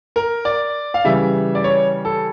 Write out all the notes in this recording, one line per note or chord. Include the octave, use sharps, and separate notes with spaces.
A#4
D5
F5
C#3 E3 G3 E5
D5
C#5
A4